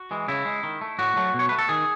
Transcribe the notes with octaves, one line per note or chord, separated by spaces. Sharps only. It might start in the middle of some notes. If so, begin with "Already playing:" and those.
Already playing: F#4
E3 G#3
C#3 E4
G#3
D#3
A3
A2 F#4
F#3 A3
B2
C#5
A3 B4
A4
D#3 G#4